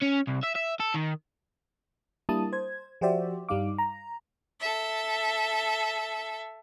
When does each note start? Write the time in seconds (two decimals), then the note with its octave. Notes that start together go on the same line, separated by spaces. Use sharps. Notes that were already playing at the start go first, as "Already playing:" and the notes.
0.02 C#4
0.27 C2
0.43 E5
0.55 E5
0.80 A4
0.95 D#3
2.29 G3 A#3 D4 E4 A5 D#6
2.53 C5 G#6
3.01 F3 F#4 G4 C5 D5 E5
3.49 G2 G3 D#4 F5 D6
3.78 A#5
4.61 A4 E5